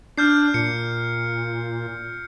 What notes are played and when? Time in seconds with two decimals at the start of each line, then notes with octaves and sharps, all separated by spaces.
0.18 D4 F6 G6 C7
0.54 A#2 C#7